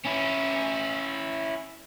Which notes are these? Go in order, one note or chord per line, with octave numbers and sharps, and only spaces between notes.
C#4 E4